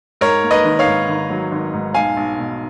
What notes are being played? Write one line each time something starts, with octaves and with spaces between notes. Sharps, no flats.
G#2 A#4 C#5
A#3
B4 D#5
G#1
C#5 F5
G#2
G#1
F#3
G#1
G#2
B1 F5 G#5
B1
B2